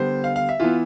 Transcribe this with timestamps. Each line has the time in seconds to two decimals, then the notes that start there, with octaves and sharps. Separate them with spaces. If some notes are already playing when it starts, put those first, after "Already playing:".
Already playing: D3 G3 B3 C5
0.24 F5
0.36 F5
0.49 E5
0.60 E3 B3 F4